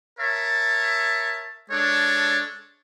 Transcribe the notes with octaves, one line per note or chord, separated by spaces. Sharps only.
A#4 C#5 E5 A5
G#3 D4 A4 C#5